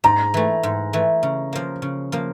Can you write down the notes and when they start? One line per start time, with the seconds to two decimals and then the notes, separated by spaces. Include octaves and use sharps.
0.04 G#2 A#5
0.34 E3 A3
0.63 G#2
0.93 E3 A3
1.23 C#3
1.53 F3 A#3
1.82 C#3
2.12 F3 A#3